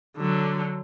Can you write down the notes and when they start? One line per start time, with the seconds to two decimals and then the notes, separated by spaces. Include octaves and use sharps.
0.17 D3 F#3